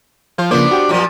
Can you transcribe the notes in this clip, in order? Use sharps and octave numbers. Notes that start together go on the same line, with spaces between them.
F3 C5
C#3 F3 A#3 B3 D4 C5
F#4 G4 G5
F#2 A#2 F3